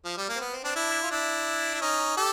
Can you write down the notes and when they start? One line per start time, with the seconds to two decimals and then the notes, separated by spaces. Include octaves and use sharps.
0.05 F3
0.18 G3
0.29 A#3
0.36 C4
0.41 B3
0.53 C4
0.64 C4 D4
0.76 D4 E4
1.03 F4
1.11 D4 E4
1.75 E4
1.81 C#4 D#4
2.17 G4 A4